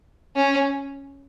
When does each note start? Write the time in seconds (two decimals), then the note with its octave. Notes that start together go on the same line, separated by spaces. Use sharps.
0.36 C#4